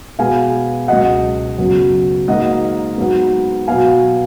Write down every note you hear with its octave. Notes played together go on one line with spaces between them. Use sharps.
B2 G#3 B3 F5 G#5
C#2 B2 F#3 D#5 F#5
F#2 C#3 F#3 B3
G#2 F#3 A#3 D#5 F#5
G#2 F#3 B3
B2 F#3 B3 F5 G#5